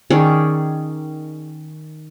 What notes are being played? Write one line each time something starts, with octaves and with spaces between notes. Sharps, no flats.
D#3 C#4 G#4 D5